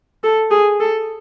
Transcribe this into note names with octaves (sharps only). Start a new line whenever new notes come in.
A4
G#4
A4